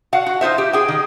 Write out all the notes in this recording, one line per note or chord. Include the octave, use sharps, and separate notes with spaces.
F#4 F5 F#5
F#4
D#4 F4 C5 E5
G4
G#4 G5
D#3